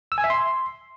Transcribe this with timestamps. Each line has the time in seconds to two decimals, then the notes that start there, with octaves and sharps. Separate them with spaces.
0.12 E6
0.18 G#5
0.24 E5
0.30 C6